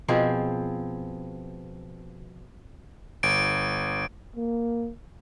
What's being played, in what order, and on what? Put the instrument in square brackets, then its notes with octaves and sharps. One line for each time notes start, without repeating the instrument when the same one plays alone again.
[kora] B2 F3 C4 G#4
[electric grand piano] G1 [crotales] D7
[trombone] A#3